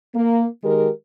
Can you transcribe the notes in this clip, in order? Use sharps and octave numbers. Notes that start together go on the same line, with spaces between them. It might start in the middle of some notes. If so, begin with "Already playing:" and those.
A#3
D#3 G#3 G4 A#4